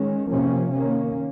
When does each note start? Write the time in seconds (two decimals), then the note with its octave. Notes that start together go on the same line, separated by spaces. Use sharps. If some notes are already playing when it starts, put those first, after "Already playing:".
Already playing: D#3 G#3 C#4
0.31 C3 F3 A#3 C#4
0.73 D#3 A#3 C#4